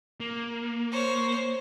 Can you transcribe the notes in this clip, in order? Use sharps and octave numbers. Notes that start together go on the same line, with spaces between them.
A#3
C5 C#5